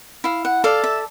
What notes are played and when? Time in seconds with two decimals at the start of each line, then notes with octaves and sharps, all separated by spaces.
0.24 E4 F5
0.45 F#5
0.64 A4 D5 F5
0.84 E5